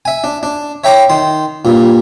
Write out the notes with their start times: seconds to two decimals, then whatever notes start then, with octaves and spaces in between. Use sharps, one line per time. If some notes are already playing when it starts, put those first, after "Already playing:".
0.05 E5 G#5
0.24 D4
0.43 D4
0.84 C#5 E5 G5 A#5 D6
1.09 D#3 C6
1.65 G2 A#2